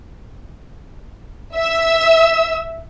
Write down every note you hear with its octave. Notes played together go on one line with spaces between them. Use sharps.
E5 E6